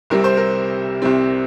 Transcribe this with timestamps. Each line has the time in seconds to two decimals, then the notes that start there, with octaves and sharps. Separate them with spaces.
0.10 C2 C3 G3 C4 A#4
0.24 C5
0.37 A#4
1.02 C2 C3 G3 C4